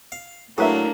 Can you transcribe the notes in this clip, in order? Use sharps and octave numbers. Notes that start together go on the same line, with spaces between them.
F5
A2 F#3 A#3 D4 G#4 B4 E5